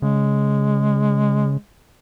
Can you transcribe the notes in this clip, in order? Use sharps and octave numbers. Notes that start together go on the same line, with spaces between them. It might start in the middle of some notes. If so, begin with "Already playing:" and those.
C#3 G#3